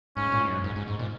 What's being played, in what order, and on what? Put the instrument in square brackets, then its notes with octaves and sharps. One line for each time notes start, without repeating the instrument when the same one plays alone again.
[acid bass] G#2 [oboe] C#4
[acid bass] A#2
G#2
F#2
G#2
G#2
G#2
A#2